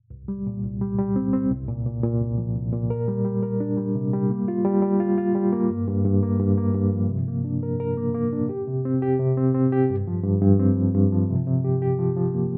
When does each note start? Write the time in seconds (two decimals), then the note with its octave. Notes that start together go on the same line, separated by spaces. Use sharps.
0.10 C2
0.28 G3
0.47 A#2
0.64 C2
0.81 G3
0.99 G3
1.16 C4
1.33 C4
1.51 C2
1.68 A#2
1.86 A#2
2.03 A#2
2.21 C2
2.38 F3
2.56 C2
2.73 A#2
2.90 A#4
3.08 G3
3.25 G3
3.43 A#4
3.60 D4
3.77 G3
3.95 C3
4.13 G3
4.30 A#3
4.48 F4
4.65 G3
4.82 G3
5.00 F4
5.18 F4
5.35 G3
5.52 A#3
5.70 G2
5.88 G2
6.05 G2
6.23 A#3
6.39 G2
6.58 A#3
6.74 G2
6.93 F3
7.09 C3
7.28 A#3
7.45 D4
7.63 A#4
7.80 A#4
7.97 A#3
8.14 A#3
8.33 D4
8.49 G4
8.67 C3
8.85 C4
9.02 G4
9.19 C3
9.37 C4
9.55 C4
9.72 G4
9.90 G2
10.07 F3
10.24 G2
10.42 G2
10.59 C4
10.76 F3
10.95 G2
11.12 F3
11.30 C3
11.47 C3
11.64 G4
11.82 G4
11.99 F3
12.16 F3
12.34 A#3